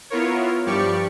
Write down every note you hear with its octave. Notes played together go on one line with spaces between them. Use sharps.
B3 E4 F4 A#4 C#5
G2 F3 G3 G4 D5 C#6